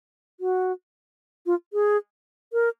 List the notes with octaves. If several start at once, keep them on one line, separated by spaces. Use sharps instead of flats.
F#4
F4
G#4
A#4